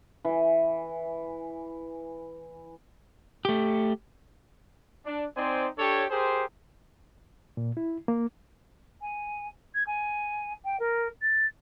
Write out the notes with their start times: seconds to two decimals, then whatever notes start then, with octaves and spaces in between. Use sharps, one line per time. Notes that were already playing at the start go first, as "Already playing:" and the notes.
0.25 E3 G#5
3.45 A3 G4
5.06 D4
5.36 C4 D#4 C5 D5 G#5
5.78 D4 G4 A4 C#5
6.10 G4 G#4 A#4 C5
7.57 A#2
7.77 E4
8.08 A#3
9.01 G#5
9.75 G#6
9.87 G#5
10.65 G5
10.80 A#4
11.22 A6